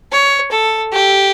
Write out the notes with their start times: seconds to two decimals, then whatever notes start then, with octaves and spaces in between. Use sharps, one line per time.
0.12 C#5
0.51 A4
0.92 G4